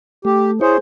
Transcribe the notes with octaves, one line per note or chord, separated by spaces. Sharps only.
A3 G4
E4 G#4 C5 C#5